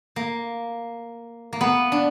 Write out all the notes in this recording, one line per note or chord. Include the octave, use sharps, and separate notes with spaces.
A#3
A#3
B3
D4